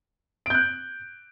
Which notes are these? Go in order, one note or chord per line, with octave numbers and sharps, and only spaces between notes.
F#6 G6 D7